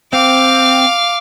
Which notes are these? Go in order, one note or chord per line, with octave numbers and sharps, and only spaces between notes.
C4 F5 D6